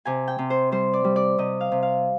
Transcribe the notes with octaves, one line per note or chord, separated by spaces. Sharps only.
C3 G#5
G5
C3
C5
G3 C5
D5
G3
D5
C3 D#5
F5
C3
F5